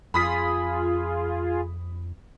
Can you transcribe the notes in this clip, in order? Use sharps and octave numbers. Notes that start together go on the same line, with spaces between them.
F2 F4 G#4 B5 D#6 B6